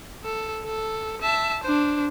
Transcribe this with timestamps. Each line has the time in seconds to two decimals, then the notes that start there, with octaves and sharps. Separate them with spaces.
0.25 A4
0.65 A4
1.22 E5 A5
1.63 D4 C5